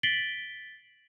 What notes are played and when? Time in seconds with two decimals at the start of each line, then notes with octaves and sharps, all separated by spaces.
0.03 A6 B6 C7 D7 F#7 G7